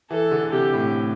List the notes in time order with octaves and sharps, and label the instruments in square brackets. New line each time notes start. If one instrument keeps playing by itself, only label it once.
[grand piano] E3 [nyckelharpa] A4
[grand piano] D3
[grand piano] C3 [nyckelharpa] G4
[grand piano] A2